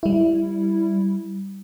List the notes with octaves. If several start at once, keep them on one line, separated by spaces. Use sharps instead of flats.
G3 E4